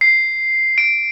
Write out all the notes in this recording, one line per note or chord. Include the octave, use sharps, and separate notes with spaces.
C7
D7